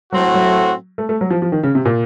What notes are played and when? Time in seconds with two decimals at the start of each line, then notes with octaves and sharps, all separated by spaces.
0.12 A2 F#3 A3 C4 F#4
0.34 F#3
0.98 A3
1.09 A3
1.21 F#3
1.31 F3
1.42 F3
1.52 D#3
1.63 C#3
1.75 C3
1.85 A#2